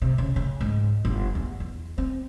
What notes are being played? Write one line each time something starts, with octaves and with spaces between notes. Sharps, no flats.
C3
C#3
C#3
G#2
G1
E2
E2
C4